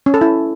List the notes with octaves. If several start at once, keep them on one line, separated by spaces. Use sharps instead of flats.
C#4
A4
E4